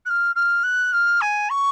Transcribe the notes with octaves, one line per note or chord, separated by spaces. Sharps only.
F#6
F6
F6
F#6
F6
G#5
C#6